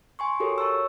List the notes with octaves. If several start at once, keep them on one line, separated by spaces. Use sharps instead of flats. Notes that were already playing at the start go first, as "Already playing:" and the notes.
G#5 C6 C#6
F#4 G4 A4 A#4 C#5
C#5 A5 C#6 E6